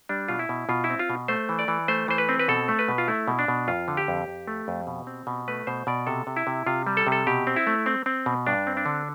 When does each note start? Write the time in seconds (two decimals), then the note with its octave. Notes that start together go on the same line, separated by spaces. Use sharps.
0.09 G3 D4
0.28 B2 F4
0.39 E4
0.49 B2
0.69 B2 F4
0.84 E4
0.90 C4
0.99 F4
1.09 B2
1.28 A3 C5
1.49 E3
1.59 D5
1.68 E3
1.88 A3 C5
2.08 E3 C5
2.18 B4
2.29 C4
2.39 B4
2.48 B2 A4
2.68 A3
2.79 B4
2.88 B2
2.98 F4
3.08 A3 E4
3.28 B2
3.39 D4
3.48 B2
3.68 F2 F4
3.88 D3
3.97 G4
4.08 F2
4.28 F2
4.48 A3
4.68 F2
4.87 B2
5.07 C4
5.27 B2
5.48 A3 B4
5.67 B2 C5
5.87 B2 D5
6.07 C3 A4
6.27 C3
6.36 E4
6.47 C3
6.66 C3 F4
6.87 G3
6.97 A4
7.07 C3
7.12 A4
7.27 B2 G4
7.47 C4
7.56 E4
7.67 A3
7.86 C4
8.06 C4
8.26 B2
8.47 G2 D4
8.67 C4
8.77 D4
8.86 D3